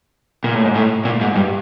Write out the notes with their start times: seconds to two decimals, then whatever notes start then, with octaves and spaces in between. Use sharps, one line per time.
0.44 A#2
0.55 A2
0.64 G#2
0.75 A2
1.05 A#2
1.21 G#2
1.36 G2